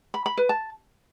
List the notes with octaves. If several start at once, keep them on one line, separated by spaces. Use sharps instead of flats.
B5
B5
B4
A5